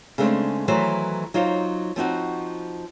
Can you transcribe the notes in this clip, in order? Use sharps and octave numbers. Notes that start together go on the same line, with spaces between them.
C#3 G#3 A3 C4 D4
D#3 E3 F#3 A3 B4 C5
F#3 D#4 F4 C5
F3 C4 D#4 F#4